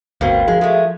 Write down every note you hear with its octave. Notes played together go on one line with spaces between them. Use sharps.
G1 D2 B2 C4 F#4 A#4 F5
F3 G#3
G#3 A3